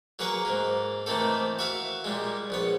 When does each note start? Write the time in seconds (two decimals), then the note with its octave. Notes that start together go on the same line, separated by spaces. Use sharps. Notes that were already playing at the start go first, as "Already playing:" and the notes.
0.19 F#3 A#3 G#4 B4 C#5
0.45 G#2 A#3
1.06 D#3 E3 A3 A#3 C4 A4
1.59 F#4 E5 F5
2.04 A#2 G3 G#3
2.50 A#1 B3 C#5